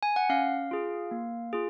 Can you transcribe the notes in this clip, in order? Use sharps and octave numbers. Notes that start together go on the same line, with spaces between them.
G#5
F#5
C#4 F5
F4 G#4
A#3
F4 G#4